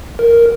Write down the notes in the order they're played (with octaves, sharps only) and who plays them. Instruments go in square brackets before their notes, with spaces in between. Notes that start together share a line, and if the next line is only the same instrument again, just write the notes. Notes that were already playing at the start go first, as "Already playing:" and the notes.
[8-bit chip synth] A#4